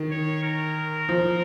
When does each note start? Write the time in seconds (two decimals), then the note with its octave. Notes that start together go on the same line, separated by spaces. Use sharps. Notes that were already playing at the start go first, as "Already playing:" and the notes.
Already playing: D#3
0.11 C#5
0.43 A#4
1.09 F3